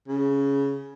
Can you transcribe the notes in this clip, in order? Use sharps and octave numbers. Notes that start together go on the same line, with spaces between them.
C#3